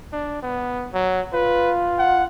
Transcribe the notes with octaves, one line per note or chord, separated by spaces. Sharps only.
D4
B3
F#3
F4 B4
F#5